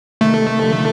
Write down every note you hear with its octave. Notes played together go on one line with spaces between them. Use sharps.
C3 D#3 A3
D3 F3
D#3